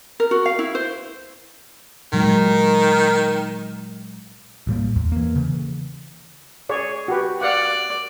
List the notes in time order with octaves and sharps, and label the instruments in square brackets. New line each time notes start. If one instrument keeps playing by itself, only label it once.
[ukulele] A#4
F#4
F5
E4
C5
[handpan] A#2 F#3 G#3 [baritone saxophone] D#3
[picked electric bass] A1 A2 G3 A#3
E2
E3 A#3
C#3 E3
[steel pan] G#4 C#5 D5
F#4 G4 B4
[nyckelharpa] D5 [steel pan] F5 F#5